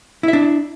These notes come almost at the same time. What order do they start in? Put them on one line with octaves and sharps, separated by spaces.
E4 E5 D4